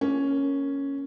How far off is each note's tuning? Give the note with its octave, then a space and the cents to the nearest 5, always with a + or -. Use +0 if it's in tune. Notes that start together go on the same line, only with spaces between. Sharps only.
A#3 +0 C#4 +0